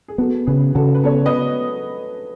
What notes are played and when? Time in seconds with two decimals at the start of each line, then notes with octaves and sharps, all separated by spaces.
0.08 G#4
0.18 B3 F#4 A4
0.47 C#3 G#4 B4
0.75 C#3 F#4 A4
0.95 B4
1.04 B3 A4 C#5
1.25 B4 D#5